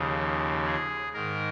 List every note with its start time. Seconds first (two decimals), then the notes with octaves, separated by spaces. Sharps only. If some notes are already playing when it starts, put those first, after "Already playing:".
Already playing: D#2 C#3 F3
0.66 G#4
1.14 G#2 D#3 A#4